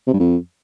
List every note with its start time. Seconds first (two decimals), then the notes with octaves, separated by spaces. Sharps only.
0.07 C3
0.13 G2
0.20 F2